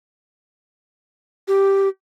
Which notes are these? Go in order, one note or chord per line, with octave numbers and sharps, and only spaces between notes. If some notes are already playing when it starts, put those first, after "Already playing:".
G4